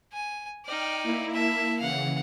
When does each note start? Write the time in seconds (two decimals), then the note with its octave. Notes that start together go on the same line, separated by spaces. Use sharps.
0.12 G#5
0.65 D#4 D5 G5 F6
1.02 A#3 E4
1.33 E5 A5
1.80 C#3 E3 F5 F#5